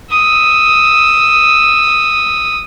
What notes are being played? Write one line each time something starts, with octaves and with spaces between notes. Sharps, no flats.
D#6 E6